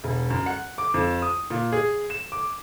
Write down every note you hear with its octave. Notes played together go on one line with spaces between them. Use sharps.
E1
F#2
F#5
D6
F2
D#6
A#2
G#4
E7
D6